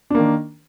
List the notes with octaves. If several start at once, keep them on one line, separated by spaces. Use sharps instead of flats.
D#3 A#3 D4